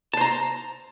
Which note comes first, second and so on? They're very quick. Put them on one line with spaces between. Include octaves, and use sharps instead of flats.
A5 C5 A#5